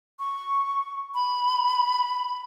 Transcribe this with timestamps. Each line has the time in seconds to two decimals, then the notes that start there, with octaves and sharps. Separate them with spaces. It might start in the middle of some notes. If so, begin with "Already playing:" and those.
0.19 C#6
1.14 B5